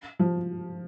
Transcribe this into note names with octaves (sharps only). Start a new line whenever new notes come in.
F3